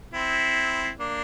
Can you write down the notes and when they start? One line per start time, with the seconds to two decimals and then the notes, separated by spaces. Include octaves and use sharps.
0.13 C4 E4
1.00 A#3 D4